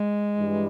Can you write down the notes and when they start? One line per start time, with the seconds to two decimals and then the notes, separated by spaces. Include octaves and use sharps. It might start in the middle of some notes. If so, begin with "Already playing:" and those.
Already playing: G#3
0.37 G2 E3 G3